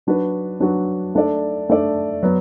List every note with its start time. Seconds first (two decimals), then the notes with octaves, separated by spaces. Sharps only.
0.07 F#3 D4 F#4 B4
0.60 F#3 D4 F#4 B4
1.15 A3 D4 A4 D5
1.69 A3 D4 A4 D5
2.23 F#3 B3